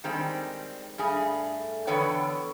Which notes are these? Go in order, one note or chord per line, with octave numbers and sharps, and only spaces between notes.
D#3 G3 G#3 C4
G2 A3 G#4
E2 D3 B3 B4 C#5 G5